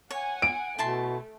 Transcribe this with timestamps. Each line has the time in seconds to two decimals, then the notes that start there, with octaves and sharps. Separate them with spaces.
0.10 C#5 F#5 G#5
0.42 D7
0.78 B2 A3 E4 A5 C6